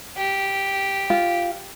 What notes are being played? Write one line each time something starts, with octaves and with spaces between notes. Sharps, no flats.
G4
F4